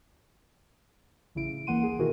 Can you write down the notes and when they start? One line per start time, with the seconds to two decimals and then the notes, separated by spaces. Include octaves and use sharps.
1.35 A1 C#3 E4 D7
1.67 C#2 E3 A#3 F#5 C6 D#7
1.83 G#4
1.99 B2 D#3 E4 F#4 G#4 A#4